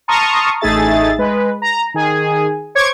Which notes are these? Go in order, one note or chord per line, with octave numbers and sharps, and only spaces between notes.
A5 A#5 C6 C#6 D#6 F6
A1 A3 D#4 G#4 E5 A6
G#3 B4
A#5
D#3 G#4 G#5
C5 C#5 C#6 D6 G#6